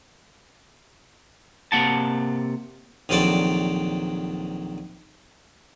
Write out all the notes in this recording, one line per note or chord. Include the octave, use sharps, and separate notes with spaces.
C3 A#3 F#5 A5
A#1 D#3 F#3 C4 A4 D5